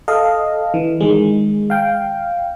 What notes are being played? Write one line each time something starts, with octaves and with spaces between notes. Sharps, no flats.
A4 D#5 F5
E3
D#3 G#3
F5 G5